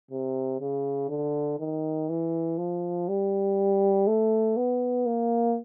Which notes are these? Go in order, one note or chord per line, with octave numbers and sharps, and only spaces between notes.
C3
C#3
D3
D#3
E3
F3
G3
A3
B3
A#3